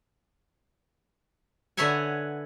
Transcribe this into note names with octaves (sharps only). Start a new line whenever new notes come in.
D3 B4 C#5 E5 F#5 G#5